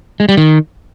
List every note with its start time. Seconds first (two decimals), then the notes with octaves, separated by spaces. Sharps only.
0.20 G#3
0.29 G3
0.37 D#3